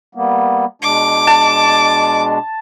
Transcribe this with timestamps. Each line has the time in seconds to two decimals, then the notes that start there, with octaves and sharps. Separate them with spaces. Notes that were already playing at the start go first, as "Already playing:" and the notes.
0.15 G3 A#3 B3
0.82 B2 G#3 D4 D6
1.27 A5